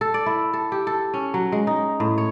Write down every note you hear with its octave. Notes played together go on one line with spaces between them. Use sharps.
A4
D5
E4
A4
G4
A4
C#4
F#3
G#3
D#4
A2
C#5